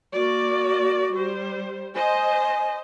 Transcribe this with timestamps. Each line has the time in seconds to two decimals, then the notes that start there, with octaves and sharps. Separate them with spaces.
0.14 A#3 F#4 D5
1.12 G3 C5
1.96 C5 D#5 G#5